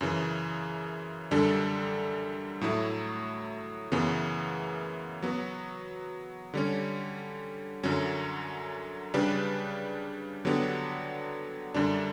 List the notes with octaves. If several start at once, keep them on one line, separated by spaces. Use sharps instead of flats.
F#2 C#3 E3
F#2 D3 G3 D4 A4
A2 F#3 A3 E4
F#2 C#3 E3 B3
F#3 B3 F#4
D3 G3 C#4
F#2 D3 F#3 C#4
C#3 G3 D4 G4 B4
D3 F#3 B3 D4 G4
F#2 D3 G3 D4